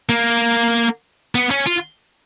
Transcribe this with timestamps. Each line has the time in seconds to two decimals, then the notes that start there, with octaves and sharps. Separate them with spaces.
0.09 A#3
1.35 B3
1.51 C#4
1.67 F4